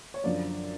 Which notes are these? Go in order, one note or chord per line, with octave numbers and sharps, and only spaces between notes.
C#5
F#2 D3 F3 D5